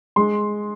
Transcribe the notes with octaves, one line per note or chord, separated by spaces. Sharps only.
G#3 C6